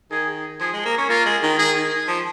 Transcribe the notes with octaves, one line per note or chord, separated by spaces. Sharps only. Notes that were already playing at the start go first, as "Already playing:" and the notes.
D#3 G#4
F3 G#4
G#3
A#3
C#4
A#3 F4
G#3
D#3
D#3 G#4
F3